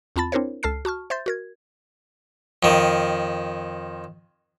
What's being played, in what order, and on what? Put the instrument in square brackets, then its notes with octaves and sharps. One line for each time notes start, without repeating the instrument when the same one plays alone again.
[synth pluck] E2 C4 F4 A5 B5 A6
C4 D4 E4 A#4 C5 C#5
C#2 A4 A5 F6 C7
F#4 A5 C#6 F6
C5 E5 C6 G6 A6
F#4 A#4 G#6
[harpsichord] F2 D#3